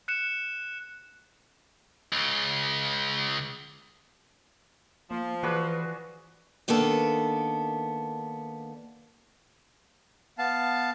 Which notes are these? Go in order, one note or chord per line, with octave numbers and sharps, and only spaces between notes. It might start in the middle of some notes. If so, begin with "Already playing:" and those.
F#6 C#7 E7
C#2 C#3
F3 A#3
E3 F#4 G#4 B4 D5
D#3 A#3 B3 D4 A4
B3 F5 A5